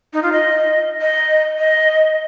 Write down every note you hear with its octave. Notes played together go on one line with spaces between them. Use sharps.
D#4
F4
D#5
D#5
D#5